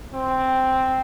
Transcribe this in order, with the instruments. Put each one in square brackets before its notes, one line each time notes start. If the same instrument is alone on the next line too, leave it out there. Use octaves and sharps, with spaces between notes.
[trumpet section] C4